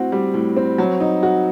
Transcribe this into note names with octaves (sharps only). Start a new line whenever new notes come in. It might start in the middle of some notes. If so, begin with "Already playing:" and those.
Already playing: A2 C4 F#4
G3
A2
C4
F#3
D#4
F#4